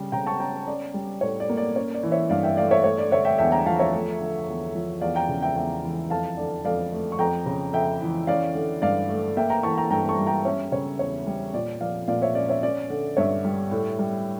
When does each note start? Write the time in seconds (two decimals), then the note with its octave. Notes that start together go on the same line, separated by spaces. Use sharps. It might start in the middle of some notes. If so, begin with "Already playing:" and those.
Already playing: C#3 G3
0.12 C#3 G5 A#5
0.26 A5 C#6
0.40 C#4 G5 A#5
0.67 C#4 D5
0.94 G3
1.21 A2 C#5
1.40 D5
1.49 A#3
1.57 D5
1.75 C#4 C#5
1.95 D5
2.03 E3
2.12 C#5 E5
2.30 G2 D5 F5
2.43 E5 G5
2.57 A3 D5 F5
2.71 C#5 E5
2.84 A3 C#5
2.98 D5
3.11 D3 C#5 E5
3.25 E5 G5
3.38 E2 E5 G5
3.52 G5 A#5
3.66 F3 F5 A5
3.80 C#5 E5
3.93 A3
4.21 D3
4.48 E2
4.75 F3
5.01 E2 D5 F5
5.16 G5 A#5
5.29 C#3
5.42 E5 G5
5.56 E2 E5 G5
5.83 E3
6.10 F2 F5 A5
6.37 D3 D5
6.65 F2 D5 F5
6.92 A3
7.12 C#6
7.19 F2 G5 A#5
7.46 C#3
7.73 F2 E5 G5
8.01 E3
8.27 C#4 D5 F5
8.55 D3
8.82 G2 D5 F5
9.09 A3
9.37 A#3 E5 G5
9.50 G5 A#5
9.63 E3 A5 C#6
9.77 G5 A#5
9.90 G2 G5 A#5
10.09 A5 C#6
10.19 G3
10.27 G5 A#5
10.45 C#4 C#5 E5
10.72 C#3 C#5
10.99 E2 C#5
11.27 G3
11.53 A#2 D5
11.81 F3 D5 F5
12.08 A#2 D5 F5
12.22 C#5 E5
12.35 C#4 D5
12.49 C#5 E5
12.63 C#4 D5
12.90 D3
13.17 G2 C#5 E5
13.45 G3
13.71 A2
13.99 G3